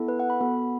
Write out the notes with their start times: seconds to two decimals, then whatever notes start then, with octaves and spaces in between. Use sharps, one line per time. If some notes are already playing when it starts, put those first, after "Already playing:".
Already playing: B3 E4 A4
0.08 B4
0.19 F#5
0.30 B5
0.40 B3 F#4 A4